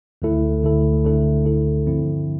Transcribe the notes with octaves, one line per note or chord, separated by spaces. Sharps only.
D2 D3 A3 E4 A4
D2 D3 A3 E4 A4
D2 D3 A3 E4 A4
D2 D3 A3 E4 A4
G2 D3 F3 C4 E4